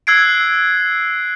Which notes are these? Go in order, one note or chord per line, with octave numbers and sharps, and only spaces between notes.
E6 F#6 G#6 C7 D7